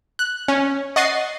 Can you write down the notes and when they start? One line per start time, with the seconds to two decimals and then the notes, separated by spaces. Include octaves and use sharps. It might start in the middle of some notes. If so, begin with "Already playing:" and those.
0.19 F#6
0.48 C#4
0.96 D#5 F#5 C#6 A6 C7 D#7